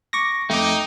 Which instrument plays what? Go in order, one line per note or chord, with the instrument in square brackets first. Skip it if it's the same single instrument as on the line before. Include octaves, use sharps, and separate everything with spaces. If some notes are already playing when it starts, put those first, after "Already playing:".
[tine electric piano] C#6 D6 A#6
[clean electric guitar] F2 A3 [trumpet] D#4 [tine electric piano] G5 D6